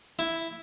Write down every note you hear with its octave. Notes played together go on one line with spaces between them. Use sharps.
E4